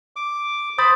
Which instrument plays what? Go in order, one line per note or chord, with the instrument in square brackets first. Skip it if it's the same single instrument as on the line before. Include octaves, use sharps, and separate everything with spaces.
[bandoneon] D6
[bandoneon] C5 B5 [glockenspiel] D#6 A6